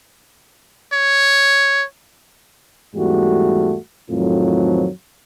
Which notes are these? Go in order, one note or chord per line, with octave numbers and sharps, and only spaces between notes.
C#5
E2 G#2 G3 A3 F#4
F2 A2 D#3 F3 F#3